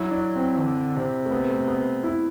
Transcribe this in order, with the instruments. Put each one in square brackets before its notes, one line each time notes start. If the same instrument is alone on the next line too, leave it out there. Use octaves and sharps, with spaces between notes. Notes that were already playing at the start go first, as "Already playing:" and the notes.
Already playing: [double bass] F#3 [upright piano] E4
[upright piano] D4
C4
[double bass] D3
C3
[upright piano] A3
B3
A3
B3
E4